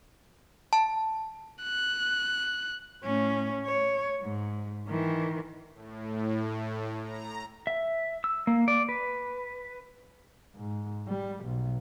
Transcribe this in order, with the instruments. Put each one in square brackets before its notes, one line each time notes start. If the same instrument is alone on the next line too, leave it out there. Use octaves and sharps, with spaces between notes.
[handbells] A5
[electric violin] F#6
[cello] A2 C#4
C#5
G#2
D#3 E3
[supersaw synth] A2
A#5
[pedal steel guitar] E5
E6
A#3
D5
B4
[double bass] G#2
G3
B1